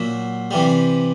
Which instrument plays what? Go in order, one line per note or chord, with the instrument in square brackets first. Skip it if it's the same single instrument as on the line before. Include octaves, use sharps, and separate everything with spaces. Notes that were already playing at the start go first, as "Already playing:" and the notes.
Already playing: [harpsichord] A#2 F#3 E5
C3 E3 G3